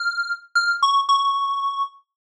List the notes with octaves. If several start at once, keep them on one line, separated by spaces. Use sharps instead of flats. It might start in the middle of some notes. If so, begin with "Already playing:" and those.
Already playing: F6
F6
C#6
C#6